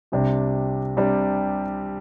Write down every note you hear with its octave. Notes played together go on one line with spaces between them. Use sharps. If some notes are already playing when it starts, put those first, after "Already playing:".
C2 C3 G3 D4
C3 G3 D4